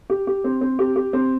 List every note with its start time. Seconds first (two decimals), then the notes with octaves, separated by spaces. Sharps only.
0.10 G4
0.27 G4
0.44 C4
0.61 C4
0.79 G4
0.96 G4
1.13 C4